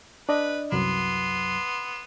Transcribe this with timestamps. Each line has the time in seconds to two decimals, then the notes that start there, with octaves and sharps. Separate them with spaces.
0.29 D4 B4 D5 D#5
0.72 C2 F#2 F#3 B3 C6